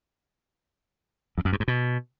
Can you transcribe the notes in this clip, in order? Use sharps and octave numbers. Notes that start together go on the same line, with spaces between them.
F2
F#2
G2
G#2
B2